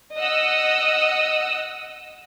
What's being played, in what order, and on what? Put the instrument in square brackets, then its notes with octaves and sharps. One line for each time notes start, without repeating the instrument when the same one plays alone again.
[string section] D#5 F#5 D#6 E6